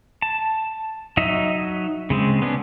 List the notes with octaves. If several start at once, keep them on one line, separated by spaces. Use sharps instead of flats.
A5
F#3 D#4 D#5 E5
C#3 G#3 C4
B3 C#4 D4